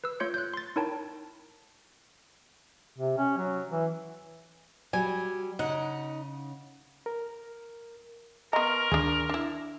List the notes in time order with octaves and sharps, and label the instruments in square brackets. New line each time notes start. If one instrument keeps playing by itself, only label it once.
[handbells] B4 E6
A3 F4 C#5 C6 G6 C#7
F#6 G6
C6 A6
D#4 E4 A#4 C#5 G5 A5
[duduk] C3
C#4
F#3
E3
[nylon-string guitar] F#3 [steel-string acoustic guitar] G3 [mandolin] G#5
[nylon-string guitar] C#3 [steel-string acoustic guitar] D#4 [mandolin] F#5
[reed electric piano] A#4
[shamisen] B3 A#5 [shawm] A#4 [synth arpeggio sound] D#5 [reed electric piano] C6 C#6 F6
[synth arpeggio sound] D2 D#3 D7 [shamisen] D4 G#4
[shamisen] D4 E4